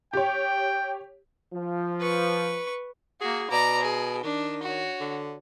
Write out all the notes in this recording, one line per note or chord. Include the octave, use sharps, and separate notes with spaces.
G4 C#5 G5
F3
B4 C#6
A#3 F#4 G#4
B2 D5 A#5
G#4
D#3 D4
F#4 C#5
D3